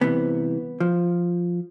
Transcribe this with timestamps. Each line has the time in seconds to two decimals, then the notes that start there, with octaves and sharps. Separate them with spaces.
0.01 C2 C3 E3 B3
0.80 F3